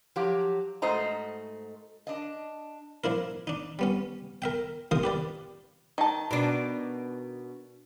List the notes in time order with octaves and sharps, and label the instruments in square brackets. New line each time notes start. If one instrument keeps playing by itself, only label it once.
[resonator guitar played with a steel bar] F3 F#3 F#4 G4
G#2 A3 F#4 C5 D#5 A#5
D4 D#5
[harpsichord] F3 D4 E4 A#4
D4 D#4
G3 B3 C#4
A#4 E5 G5
C3 D#4 F4 A#4 C5 D#6
G4 B4 D5
[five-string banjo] D#3 A5
[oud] B2 D4